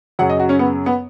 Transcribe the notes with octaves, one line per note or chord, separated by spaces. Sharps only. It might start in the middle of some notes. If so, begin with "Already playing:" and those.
F#2 C#3 F#3 F#5
D#5
F#4
C#4
B3
B3